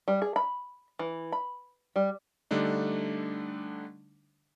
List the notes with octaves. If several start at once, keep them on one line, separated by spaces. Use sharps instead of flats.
G3
G#4
B5
E3
B5
G3
D3 G3 A3 D4 D#4